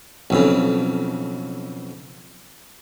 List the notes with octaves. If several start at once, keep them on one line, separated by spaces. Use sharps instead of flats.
B1 F2 C#3